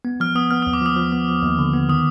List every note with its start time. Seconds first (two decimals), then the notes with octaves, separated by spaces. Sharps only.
0.05 B3
0.20 F3 F6
0.35 B3 D#6
0.51 B3 F6
0.62 D#2 D#6
0.73 D6
0.82 F3 D#6
0.96 F3
1.12 B3
1.28 F3
1.42 D#2
1.59 D3
1.73 B3
1.89 D#3 D#6